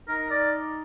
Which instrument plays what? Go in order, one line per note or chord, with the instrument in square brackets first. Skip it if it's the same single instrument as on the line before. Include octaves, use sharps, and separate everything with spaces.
[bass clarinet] D#4 [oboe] A#4
[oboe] D5